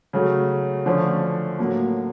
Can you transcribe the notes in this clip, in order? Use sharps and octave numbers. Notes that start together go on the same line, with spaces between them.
C#3 F#3 A3
D3 F3 A3 C#4
A2 F#3 A#3